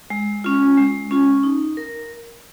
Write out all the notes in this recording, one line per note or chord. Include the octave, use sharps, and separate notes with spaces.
G#3
C#4 F4
G#3
C#4 F4
D#4
A#4